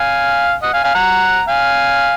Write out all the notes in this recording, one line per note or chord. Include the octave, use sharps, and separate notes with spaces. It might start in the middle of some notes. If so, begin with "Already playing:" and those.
Already playing: F5 G#5
D#5 F#5
F5 G#5
F5 G#5
F#5 A#5
F5 G#5